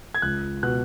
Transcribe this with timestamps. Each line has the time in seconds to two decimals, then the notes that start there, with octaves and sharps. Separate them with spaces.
0.15 G#6
0.22 C#2 F#6
0.63 B2 F#6